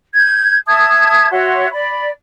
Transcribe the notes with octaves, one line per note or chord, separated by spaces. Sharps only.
G6 G#6
E5 A5 D#6 G#6
F#4 C#5 E5 C6
D5 B5